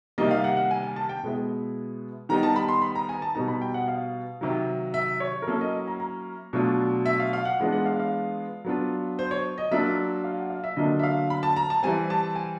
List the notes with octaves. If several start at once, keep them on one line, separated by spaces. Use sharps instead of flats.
C3 D#3 G3 A#3 D#5
F5
F#5
F#5
G#5
G#5
A5
G5
B2 G#3 B3 E4
D#3 G3 B3 D#4 A#5
A5
B5
C6
B5
A#5
G#5
A5
B2 G3 B3 D#4 A#5
B5
G5
F#5
F5
C3 D#3 F#3
E5
C#5
A#4
F#3 A#3 C#4 E4 A4
D#5
A#5
A#5
B2 F#3 A3 D4 F4
E5
F5
F5
F#5
E3 G#3 B3 D4 F4
F#5
F5
F5
F#3 B3 D4 F4
C5
C#5
D#5
F#3 A#3 D4 F4 E5
F5
F#5
F5
E5
D3 F#3 A#3 D4 F4 D#5
E5
F5
B5
A5
A#5
A5
E3 G3 C4 G#5
A5
G#5